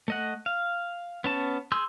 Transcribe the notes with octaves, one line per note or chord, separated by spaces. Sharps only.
A3 D#5 F#5
F5
B3 C#4 A5
G#4 C6 E6 G6